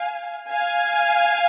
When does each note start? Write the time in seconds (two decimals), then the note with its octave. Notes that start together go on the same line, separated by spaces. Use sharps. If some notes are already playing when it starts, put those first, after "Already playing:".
Already playing: F5 G#5
0.49 F5 G#5